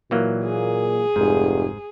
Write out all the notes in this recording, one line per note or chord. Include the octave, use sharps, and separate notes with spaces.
A#2 E3 F#3 A#3
G#4
F1 G#2